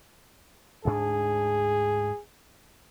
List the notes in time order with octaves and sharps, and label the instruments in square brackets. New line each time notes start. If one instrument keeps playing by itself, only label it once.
[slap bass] D2 G#2 D4 [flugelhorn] G#4